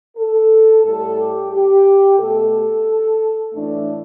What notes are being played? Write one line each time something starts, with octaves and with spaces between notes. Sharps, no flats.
A4
A2 G3 A4
G4
G4
B2 A3 A4
A2 E3 A3 D4